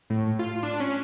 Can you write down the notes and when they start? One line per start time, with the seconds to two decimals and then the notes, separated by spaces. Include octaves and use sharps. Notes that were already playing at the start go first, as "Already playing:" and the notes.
0.10 A2
0.39 F4
0.63 D4
0.80 C#4